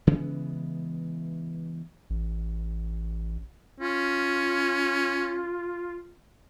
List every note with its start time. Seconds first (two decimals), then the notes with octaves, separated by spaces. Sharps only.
0.07 C#3 E3 G#3 B3
2.10 A1
3.80 C#4 F4